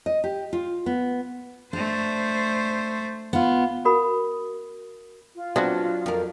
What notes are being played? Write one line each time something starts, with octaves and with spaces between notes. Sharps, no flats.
D#5
G4
F4
B3
A3 D4 C5
B3 F4
F#4 A#4 B5 D#6
F4
F#3 B3 C4 D4 F#4
F2 A#4